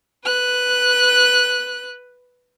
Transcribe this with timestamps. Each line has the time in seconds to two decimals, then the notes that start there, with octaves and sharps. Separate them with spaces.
0.24 B4 F#6